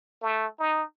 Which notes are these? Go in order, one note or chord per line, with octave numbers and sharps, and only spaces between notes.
A3
D#4